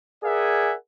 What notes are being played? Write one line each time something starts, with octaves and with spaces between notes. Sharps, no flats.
G#4 A#4 D5 E5 F#5 G#5